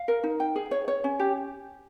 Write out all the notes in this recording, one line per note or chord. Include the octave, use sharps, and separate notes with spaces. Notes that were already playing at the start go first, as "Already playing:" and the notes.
Already playing: F5
A#4
D#4
G5
G#4
C#5
C#5
C#4
G4